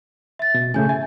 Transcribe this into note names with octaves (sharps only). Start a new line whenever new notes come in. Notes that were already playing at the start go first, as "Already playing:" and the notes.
E5 A6
B2
A2 C#3 A3 G#5 G6
E5 G#5